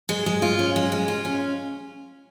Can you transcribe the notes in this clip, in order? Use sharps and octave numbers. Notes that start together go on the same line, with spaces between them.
G#3
G#3
F4
C#4
G#3
G#3
F4
C#4